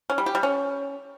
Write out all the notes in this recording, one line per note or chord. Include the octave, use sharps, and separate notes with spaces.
C#4
G3
G4
G3
C#4